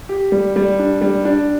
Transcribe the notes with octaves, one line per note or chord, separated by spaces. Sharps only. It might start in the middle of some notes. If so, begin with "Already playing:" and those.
G4
G3
G3
D4
G3
D4